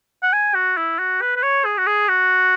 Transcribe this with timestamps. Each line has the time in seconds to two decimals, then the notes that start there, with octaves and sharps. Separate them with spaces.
0.23 F#5
0.33 G#5
0.55 F#4
0.78 E4
0.99 F#4
1.21 B4
1.36 B4
1.43 C#5
1.65 G#4
1.78 F#4
1.87 G#4
2.09 F#4